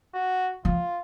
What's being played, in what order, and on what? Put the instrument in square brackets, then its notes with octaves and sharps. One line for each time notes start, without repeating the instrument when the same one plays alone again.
[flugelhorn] F#4
[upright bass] F3 [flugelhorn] F4